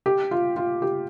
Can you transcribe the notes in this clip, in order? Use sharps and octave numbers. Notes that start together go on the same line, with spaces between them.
G4
F4
F4
G4